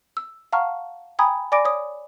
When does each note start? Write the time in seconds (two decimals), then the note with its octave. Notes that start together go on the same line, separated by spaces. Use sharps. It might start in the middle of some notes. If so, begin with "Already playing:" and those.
0.17 E6
0.53 F5 F#5 A5 A#5 C#6 F6
1.19 G5 G#5 A#5 B5 D#6 G#6
1.52 D5 G#5 B5 D6 A#6 D7
1.65 C#5 D#6